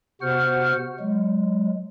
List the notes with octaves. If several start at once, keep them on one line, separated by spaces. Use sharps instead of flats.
C3 B3 F#4 C5 F#5 F6
F#3 G#3